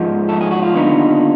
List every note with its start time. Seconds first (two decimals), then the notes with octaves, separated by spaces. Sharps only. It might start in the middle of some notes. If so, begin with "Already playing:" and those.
Already playing: G#2 F3 G#3
0.29 A4
0.41 G#4
0.51 F#4
0.62 F4
0.74 D#2 D3 G3 B3 D#4